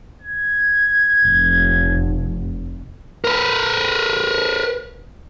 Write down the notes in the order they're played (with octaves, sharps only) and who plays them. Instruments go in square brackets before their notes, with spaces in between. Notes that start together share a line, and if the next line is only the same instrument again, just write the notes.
[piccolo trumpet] G#6
[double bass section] F1
[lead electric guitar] A#4 B4